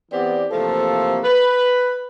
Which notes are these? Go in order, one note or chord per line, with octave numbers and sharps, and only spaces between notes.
E3 B3 C4 G4 D5
C3 E3 F3 A3 A#3 A4
B4